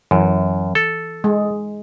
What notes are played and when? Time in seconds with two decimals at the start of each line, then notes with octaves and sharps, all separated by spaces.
0.11 F#2 E3
0.75 A4
1.24 G#3